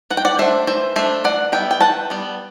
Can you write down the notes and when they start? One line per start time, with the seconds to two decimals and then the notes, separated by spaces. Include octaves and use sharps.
0.10 E3 F#5
0.17 G5
0.25 D5 F#5
0.39 A3 D4 C5 E5
0.67 E3 C5 E5
0.96 A3 D4 C5 E5
1.24 E3 D5 F#5
1.52 G3 B3 E5 G5
1.71 G5
1.81 E3 F#5 A5
2.10 G3 B3